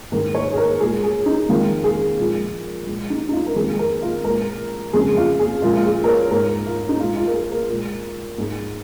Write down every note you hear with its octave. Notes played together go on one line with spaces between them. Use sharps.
G#2 D#3 G#3 A#4
C#5
G#4
A#4
A#2 G#3 G#4
G#4
D#4
F2 D#3 G#3 F4
G#4
A#2 F3 G#3
A#2 F3 G#3
D#4
D#4
F4
A#4
F2 D#3 G#3 G#4
G#4
A#4
F4
A#2 G#3 A#4
F2 C#3 G#3 G#4
F4
G#4
A#2 F3 G#3 F4
F4
G#4
A#4
C#5
G#2 G#3 A#4
F4
D#4
A#2 G#3 F4
F4
A#4
G#4
A#4
A#2 G#3
G#2 G#3